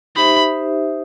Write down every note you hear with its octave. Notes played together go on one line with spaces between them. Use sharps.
D#4 G4 C5 E5 B5